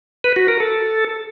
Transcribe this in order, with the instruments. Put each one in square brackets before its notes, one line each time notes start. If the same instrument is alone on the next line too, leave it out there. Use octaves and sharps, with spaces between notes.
[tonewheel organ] B4
F#4
A#4
A4